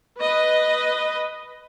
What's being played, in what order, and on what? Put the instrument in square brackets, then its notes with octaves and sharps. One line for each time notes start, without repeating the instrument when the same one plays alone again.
[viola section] B4 D#5